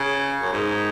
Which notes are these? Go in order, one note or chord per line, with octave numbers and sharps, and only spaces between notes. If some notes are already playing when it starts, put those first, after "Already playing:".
Already playing: C#3
F#2
G#2